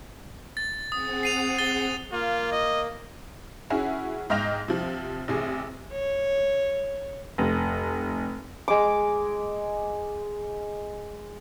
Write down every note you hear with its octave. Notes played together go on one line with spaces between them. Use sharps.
A6
C4 G#4 F#5 D#6
C7 D#7 F7
A6 G7
A#3 F4
D#5
C#4 E4 F#4 G#4
G#2 D#5 F5 G5 A#6 F7
C3 F3
A1 C3 G#4
C#5
F1
G#3 D6